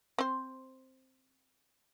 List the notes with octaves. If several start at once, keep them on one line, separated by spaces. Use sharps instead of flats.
C4 C5